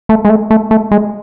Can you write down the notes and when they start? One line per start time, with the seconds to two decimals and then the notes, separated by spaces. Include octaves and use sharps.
0.09 A3
0.25 G#3
0.30 A3
0.51 A3
0.71 A3
0.91 G#3